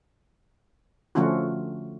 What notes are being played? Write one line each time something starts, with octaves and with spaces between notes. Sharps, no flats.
D3 F3 A3 C#4 F4 F#4